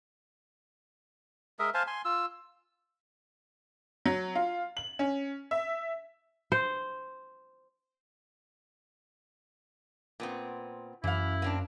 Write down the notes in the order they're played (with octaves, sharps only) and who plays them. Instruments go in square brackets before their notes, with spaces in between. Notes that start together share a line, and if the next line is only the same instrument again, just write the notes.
[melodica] G#3 A#4 D#5 E5
C5 F5 G#5 A5
G#5 C6
F4 E6
[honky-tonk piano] F#3
F4
F#7
C#4
E5
[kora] C5
[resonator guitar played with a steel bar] A#2 B3 C4
[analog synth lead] F#2 [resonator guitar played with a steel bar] E3 F5 [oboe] E4
[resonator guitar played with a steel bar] A#3 C4 D4